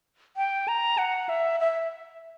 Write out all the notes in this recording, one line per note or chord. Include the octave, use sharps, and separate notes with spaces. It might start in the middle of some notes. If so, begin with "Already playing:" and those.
G5
A#5
F#5
E5
E5